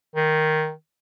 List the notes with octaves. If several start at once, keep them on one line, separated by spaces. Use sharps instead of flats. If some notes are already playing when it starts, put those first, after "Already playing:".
D#3